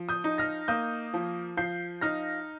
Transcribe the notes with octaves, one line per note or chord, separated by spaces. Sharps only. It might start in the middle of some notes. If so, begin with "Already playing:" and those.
Already playing: F3
D#6 G6
D#4
F6 A#6
A#3 D#6 G6
F3
F3 G6 C7
D#4 F6 A#6